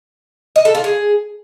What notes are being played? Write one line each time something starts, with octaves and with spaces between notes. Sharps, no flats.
D#5
A4
F4
G#4